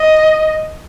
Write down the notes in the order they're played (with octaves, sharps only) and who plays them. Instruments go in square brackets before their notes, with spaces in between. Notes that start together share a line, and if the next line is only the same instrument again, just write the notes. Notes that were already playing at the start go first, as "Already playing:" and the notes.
Already playing: [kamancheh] D#5